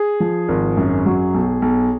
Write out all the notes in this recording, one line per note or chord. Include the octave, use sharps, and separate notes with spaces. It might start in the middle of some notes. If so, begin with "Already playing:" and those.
Already playing: G#4
F3
G#1
F#2
F#3
B1
B1